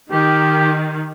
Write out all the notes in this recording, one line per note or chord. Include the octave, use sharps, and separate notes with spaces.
D#3 G4